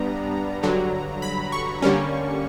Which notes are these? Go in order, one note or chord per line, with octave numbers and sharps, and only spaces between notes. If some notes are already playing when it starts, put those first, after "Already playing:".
Already playing: G2 G3 B3 D4 A#5
G2 D3 F#3
B5
C#6
D3 G3 A#3 C#4